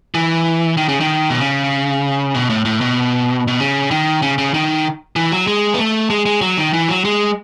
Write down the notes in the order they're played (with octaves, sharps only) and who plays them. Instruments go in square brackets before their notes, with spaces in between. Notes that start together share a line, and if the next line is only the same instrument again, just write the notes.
[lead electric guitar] E3
D#3
C#3
D#3
B2
C#3
B2
A2
A2
B2
B2
C#3
D#3
C#3
C#3
D#3
E3
F#3
G#3
B3
A3
G#3
G#3
F#3
D#3
E3
F#3
G#3